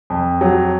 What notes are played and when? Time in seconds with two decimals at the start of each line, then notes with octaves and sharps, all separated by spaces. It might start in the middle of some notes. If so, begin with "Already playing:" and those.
0.10 F2
0.41 F#3